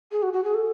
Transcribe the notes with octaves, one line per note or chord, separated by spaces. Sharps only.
G#4
F#4
F#4
G#4
A4